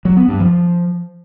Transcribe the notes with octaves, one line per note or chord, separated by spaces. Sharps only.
F#3
B3
G2
F3